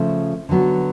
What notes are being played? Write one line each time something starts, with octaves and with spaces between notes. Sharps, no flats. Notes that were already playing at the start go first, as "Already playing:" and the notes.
Already playing: C#3 F3 A3
D3 F#3 B3